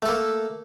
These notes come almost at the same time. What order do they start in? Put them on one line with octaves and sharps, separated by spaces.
A3 A4 A#3